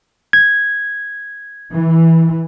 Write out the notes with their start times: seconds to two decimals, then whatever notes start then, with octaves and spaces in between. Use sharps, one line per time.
0.33 G#6
1.71 E3